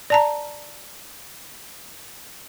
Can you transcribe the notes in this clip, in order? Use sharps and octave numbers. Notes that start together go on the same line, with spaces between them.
D5 A5 A#5